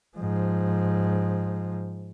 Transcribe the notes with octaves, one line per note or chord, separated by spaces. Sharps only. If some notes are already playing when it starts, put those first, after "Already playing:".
G#2 F3